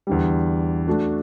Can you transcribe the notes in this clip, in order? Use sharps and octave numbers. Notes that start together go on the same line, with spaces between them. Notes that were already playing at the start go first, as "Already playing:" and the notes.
E2 D3 G3
A3 D4 F#4 A4